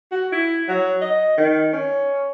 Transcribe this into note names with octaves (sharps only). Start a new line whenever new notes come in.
F#4
E4
F#3
D#5
D#3
C#4